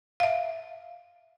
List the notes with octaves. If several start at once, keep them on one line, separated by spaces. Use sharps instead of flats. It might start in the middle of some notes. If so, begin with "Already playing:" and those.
E5 F5